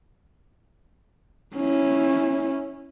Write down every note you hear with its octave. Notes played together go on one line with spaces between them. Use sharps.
C#4 E4